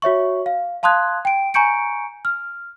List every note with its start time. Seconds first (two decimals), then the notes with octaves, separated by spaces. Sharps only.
0.02 F#4 C#5 E5 C#6
0.46 F5
0.83 F5 A5 C6 D#6 F#6 G#6
1.25 G5 D7
1.54 G#5 A#5 C#6 G6 C#7 D7
2.25 F6